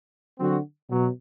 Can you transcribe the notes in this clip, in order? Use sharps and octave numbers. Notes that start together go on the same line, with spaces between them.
D3 F#3 C4 F#4
B2 F#3